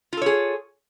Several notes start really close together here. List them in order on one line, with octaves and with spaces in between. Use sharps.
F4 A4 C#5 G#4